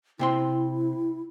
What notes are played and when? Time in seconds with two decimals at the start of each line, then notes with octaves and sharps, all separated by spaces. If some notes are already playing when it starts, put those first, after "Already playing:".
0.19 C3 C4 E4 C6